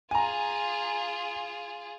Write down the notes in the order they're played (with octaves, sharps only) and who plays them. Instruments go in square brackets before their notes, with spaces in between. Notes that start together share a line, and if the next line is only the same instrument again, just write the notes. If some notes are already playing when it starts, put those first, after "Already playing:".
[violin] F4 G#4 [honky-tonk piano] G#5 A#5